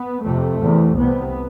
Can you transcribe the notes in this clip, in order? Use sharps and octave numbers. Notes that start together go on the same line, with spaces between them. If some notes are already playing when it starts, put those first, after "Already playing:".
Already playing: B3
F2 C3 A3
E2 C3
C2 C3 B3